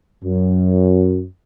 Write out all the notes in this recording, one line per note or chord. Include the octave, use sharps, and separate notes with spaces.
F#2